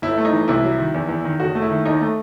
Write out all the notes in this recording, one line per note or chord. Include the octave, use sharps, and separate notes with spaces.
G1 E4
A3
D#4
E3
C2 E4
F#3
D#3
E2
E2
D#3
F#1 F#4
A3
E4
D#3
D#2 D#4
A3